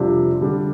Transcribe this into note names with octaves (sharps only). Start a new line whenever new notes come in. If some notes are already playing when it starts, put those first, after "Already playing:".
Already playing: F2 C3 G3 D4 F4
D3 G3 D4